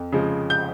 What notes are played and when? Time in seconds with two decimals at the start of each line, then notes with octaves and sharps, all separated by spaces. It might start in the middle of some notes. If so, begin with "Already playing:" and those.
Already playing: F2
0.12 C#3 F3 G#3
0.50 G6